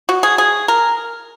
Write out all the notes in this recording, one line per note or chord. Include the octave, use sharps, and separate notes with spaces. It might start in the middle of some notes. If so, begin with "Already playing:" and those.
F#4
G#4
G#4
A#4